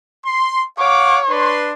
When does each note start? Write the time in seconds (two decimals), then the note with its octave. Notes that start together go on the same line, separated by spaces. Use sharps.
0.25 C6
0.78 C#5 F5 F#5 D6
1.29 D4 B4 C6